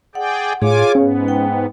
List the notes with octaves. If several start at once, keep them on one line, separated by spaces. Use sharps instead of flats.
G#4 D5 F#5 G5
A2 F4 G#4 C#5 F5 G#5 D6
G#2 B3 C#4
G5